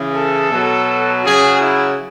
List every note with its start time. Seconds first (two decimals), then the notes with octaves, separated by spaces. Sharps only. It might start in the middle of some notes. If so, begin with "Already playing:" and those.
Already playing: C#3 E3
0.15 A4
0.50 B2 F#3
1.24 C#3 F#3 G#4
1.60 E4